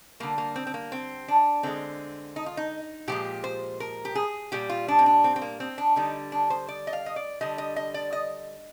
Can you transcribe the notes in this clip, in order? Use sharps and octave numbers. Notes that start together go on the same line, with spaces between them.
D3 G3 A#3
A#3
C4
C4
A#3
C4
D4
D3 G#3 C4
D#4
F4
D#4
A#2 F3 G#3 G4
C5
A#4
G4
G#4
A#2 G3 G4
F4
D4
C4
D4
C4
C4
A#3
C4
D4
D3 G3 D#4
D4
C5
D5
D#5
F5
D#5
D5
D3 G3 D#5
D#5
D#5
D5
D#5